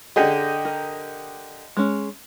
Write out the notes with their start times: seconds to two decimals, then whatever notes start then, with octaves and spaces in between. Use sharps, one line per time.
0.16 D3 G4 G#4 D#5
0.65 A#4
1.77 G#3 C#4